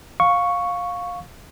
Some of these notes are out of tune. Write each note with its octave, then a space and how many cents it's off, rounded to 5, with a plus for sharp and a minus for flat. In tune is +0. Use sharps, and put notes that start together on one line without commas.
F5 +20 C#6 +0